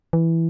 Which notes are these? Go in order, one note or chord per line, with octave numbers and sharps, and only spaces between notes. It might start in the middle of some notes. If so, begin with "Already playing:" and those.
E3